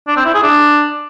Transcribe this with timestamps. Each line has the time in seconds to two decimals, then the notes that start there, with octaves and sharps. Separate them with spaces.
0.08 D4
0.17 C4
0.25 E4
0.34 G#4
0.43 D4